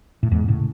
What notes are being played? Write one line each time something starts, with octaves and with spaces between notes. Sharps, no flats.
A2
E2 G#2
A2 C#3